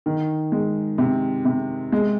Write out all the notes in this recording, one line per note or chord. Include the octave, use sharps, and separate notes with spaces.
D#3
G#3
C3
C3
G#3